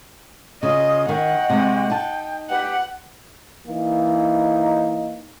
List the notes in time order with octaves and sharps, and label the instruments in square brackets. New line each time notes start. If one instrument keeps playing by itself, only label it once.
[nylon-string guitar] C#3 [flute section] F4 D#6 [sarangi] D#5
[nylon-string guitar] D#3 [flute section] D#5 G5 C#6 [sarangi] F#5
[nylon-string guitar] C3 G#3
[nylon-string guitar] D#4 A5 [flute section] G5
[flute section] G4 B4 G5 [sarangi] F#5
[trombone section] E3 A#3 D#4